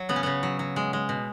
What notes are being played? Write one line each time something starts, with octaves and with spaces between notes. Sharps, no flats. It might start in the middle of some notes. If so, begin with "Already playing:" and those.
Already playing: F#3
C#3 B3
C#4
C#3 B3
F#3
F#3
G#3
G#3
B2